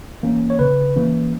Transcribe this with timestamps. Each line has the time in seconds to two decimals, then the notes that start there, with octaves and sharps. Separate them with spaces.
0.23 E3 A#3 C#4
0.50 C#5
0.59 C#3 B4
0.96 E3 A#3 C#4